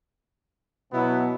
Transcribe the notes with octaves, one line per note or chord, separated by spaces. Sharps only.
B2 F#3 B3 E4